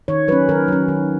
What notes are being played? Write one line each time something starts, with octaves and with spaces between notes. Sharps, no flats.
D#3 C#5
F#3 C#4 B4
D#3 A#4
F#3 C#4
D#3